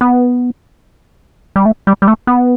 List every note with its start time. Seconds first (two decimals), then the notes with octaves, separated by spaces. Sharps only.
0.01 B3
1.56 G3
1.65 A3
1.87 G3
2.02 G3
2.08 A3
2.27 B3